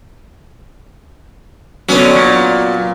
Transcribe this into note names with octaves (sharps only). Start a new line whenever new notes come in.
D3 F#3 B3 C#4
A#2